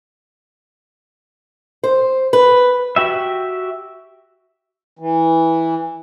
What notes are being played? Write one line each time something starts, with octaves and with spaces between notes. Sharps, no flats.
C5
B4
F#4 G4 E5
E3